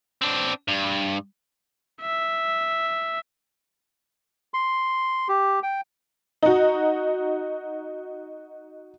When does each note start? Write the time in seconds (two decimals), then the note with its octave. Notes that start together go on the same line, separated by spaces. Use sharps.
0.22 C4 D4
0.68 G2
2.02 E5
4.54 C6
5.28 G4
5.63 G5
6.43 D#4 F#4